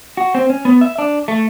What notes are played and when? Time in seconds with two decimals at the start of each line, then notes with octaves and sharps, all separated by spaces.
0.17 F#4
0.35 C4
0.50 C#4
0.65 B3
0.81 E5
0.99 D4
1.28 A3